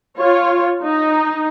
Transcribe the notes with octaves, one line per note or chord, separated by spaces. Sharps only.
F4 C#5
D#4